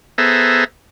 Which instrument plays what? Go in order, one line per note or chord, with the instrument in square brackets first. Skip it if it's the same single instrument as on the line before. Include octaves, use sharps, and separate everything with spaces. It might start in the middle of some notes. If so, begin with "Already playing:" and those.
[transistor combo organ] B3 G#4 A4 C5 E5 A#5